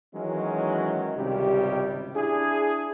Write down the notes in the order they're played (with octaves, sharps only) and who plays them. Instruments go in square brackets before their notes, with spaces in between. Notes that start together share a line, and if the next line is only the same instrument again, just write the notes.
[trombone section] D#3 E3 F#3 G#3 C#4
G#1 C#2 C3 G3 G4
D4 E4 G#4